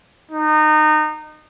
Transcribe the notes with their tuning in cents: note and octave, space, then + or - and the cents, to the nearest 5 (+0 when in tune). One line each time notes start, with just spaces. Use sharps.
D#4 -25